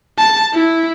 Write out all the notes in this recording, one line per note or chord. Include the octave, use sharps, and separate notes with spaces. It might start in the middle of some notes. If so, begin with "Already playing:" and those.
A5
E4